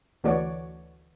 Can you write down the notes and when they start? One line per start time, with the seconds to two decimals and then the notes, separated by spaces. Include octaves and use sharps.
0.24 D2 E3 A3 F#4 C#5 D5